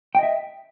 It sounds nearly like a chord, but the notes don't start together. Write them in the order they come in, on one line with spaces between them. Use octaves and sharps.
G5 D#5 E5